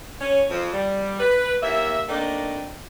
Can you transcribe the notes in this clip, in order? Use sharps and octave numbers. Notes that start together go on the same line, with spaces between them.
C#4
F2 F3
G3
B4
D#2 A#3 E5
A3 A#3 C4 D4 D#4